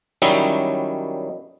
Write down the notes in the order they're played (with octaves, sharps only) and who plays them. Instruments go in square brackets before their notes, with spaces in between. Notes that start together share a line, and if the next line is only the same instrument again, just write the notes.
[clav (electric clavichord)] D#3 F#3 G3 C#4 D#4 E4